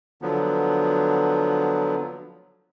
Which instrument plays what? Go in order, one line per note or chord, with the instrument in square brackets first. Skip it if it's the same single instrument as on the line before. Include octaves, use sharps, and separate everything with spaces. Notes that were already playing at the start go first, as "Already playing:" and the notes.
[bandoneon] D3 F3 F#3 B3